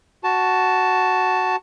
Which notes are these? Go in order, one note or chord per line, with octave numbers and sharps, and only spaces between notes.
F#4 A5